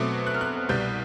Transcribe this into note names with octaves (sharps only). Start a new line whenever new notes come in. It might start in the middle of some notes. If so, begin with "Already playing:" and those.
Already playing: B2 F#3 A3 C4 D6
F#6
F6
F#6
C2 B2 G3 G6